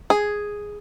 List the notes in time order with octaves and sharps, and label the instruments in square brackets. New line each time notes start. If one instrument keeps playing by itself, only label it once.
[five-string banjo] G#4